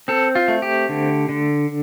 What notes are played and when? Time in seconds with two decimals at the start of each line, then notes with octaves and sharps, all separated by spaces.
0.08 C4 A4
0.35 F4
0.48 A3
0.62 G4
0.89 D3
1.29 D3